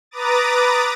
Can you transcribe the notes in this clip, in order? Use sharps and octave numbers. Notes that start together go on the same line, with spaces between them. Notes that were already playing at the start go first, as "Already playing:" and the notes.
B4 A#5 D6 D#6 A6